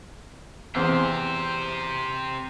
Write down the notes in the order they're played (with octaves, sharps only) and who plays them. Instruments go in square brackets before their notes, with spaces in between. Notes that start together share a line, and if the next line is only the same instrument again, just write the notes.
[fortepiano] E2 C4 [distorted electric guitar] G4 C5 [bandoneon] A#5 C6